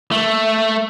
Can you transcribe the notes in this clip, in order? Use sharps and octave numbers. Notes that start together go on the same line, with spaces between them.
A3